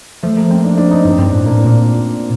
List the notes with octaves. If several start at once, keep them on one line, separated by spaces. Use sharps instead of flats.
F3 A3
A#3
C4
D4
D4
D#4
G2 D4
G2 C4
A2 D4
A#2 A#3
A2
A#2